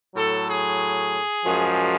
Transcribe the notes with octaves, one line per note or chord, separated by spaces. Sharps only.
A2 F#3 A4
G#4
F#2 F3 G#3